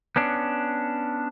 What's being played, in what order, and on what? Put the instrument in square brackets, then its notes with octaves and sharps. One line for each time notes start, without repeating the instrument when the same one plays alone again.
[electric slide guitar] B3 C#4 D4